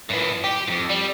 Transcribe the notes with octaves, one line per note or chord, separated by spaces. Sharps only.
F#2 E3
G4
F2 G#2
G3